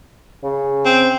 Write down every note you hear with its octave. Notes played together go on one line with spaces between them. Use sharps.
C#3
C4